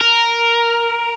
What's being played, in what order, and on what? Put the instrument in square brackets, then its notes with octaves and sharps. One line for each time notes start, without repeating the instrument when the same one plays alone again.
[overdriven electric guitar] A#4